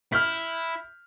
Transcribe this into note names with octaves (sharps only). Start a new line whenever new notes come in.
E4 F6 G6 B6